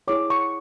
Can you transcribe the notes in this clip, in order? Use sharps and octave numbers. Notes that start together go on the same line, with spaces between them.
E4 G#4 C#5 D6
C#6